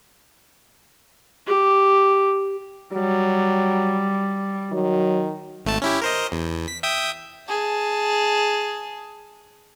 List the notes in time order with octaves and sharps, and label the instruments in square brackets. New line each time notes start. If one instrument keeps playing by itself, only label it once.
[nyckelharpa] G4
[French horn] F#3 [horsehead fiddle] G3
[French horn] D#3 [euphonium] F#3
[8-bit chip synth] G#1 A3 A5
C#4 E4 G4
A#4 C5 D#5
E2
B6
E5 G5 D#6
[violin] G#4 A5